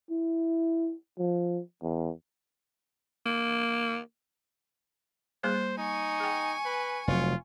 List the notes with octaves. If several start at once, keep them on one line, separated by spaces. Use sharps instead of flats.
E4
F3
E2
A#3
G3 A#3 G#4 C5
D#4 G#5 C#6
G#4 G5
B4
F1 F#3 F4